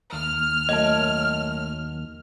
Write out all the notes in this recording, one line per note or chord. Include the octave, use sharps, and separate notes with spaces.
D#2 F6
F#2 A2 D#5 A5